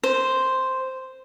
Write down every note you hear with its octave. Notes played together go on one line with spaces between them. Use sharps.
C5